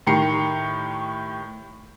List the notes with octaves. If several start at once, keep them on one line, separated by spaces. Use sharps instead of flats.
A2 D#3 G4 A#5 C7 C#7